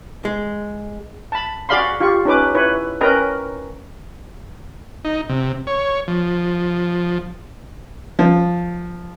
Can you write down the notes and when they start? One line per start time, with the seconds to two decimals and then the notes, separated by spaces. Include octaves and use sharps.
0.25 G#3
1.32 A5 B5
1.69 F#4 G#4 D5 F5 B5 C6
2.00 F4 G4 C#6
2.25 C#4 D#4 B4 D6
2.55 E4 B4 C#5
3.01 C#4 A#4 B4 D#5 G5 A#5
5.05 D#4
5.29 C3
5.67 C#5
6.08 F3
8.19 F3